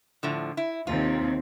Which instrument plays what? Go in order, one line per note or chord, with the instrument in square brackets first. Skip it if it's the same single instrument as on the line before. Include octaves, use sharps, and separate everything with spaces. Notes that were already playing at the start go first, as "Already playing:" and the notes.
[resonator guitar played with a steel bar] A2 D3 F3
E4
[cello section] D#2 C3 C4 [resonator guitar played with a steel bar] F4